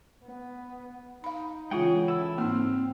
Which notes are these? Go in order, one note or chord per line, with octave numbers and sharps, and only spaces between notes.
B3
D#4 F5 B5
C#3 E3 G#3 F4 G#4 F#5 G5
E4 A4 E6
G#2 A#3 C4 D#4 E6 F6